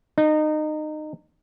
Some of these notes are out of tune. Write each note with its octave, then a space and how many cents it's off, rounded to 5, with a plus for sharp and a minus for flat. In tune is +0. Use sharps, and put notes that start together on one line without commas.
D#4 -25